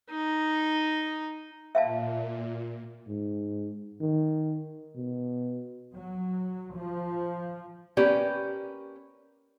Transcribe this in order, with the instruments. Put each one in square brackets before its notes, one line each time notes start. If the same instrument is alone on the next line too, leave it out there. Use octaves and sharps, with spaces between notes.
[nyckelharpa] D#4
[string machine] A#2 [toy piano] E5 F5 A5
[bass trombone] G#2
D#3
B2
[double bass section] F#3
F3
[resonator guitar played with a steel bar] A#3 C#4 G4 B4 D5